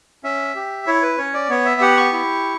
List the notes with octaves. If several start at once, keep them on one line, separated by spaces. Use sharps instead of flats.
C#4 E5
G4
E4 C#5
B4
C#4 C#5
D5
B3 C#5
E5
G4 F#5
C#6
E4